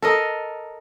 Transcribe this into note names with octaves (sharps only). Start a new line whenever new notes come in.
A4 A#4 D#5